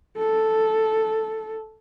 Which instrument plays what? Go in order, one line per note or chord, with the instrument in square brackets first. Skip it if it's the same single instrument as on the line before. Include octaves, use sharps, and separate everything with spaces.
[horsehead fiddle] A4